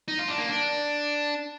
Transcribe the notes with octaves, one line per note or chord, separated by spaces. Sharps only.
D#4
F4
D4
A#3
D4